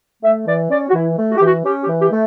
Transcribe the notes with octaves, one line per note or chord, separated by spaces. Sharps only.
A3 E5
E3 D5
C#4 D5
F#4
E3 E4
A3
F#4
G4
E3 F#4
C#4 G4
G4
E3
G4
A3